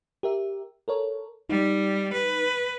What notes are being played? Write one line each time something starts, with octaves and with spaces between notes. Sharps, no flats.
G4 A#4 E5
A4 A#4 C#5
G3 D#4
B4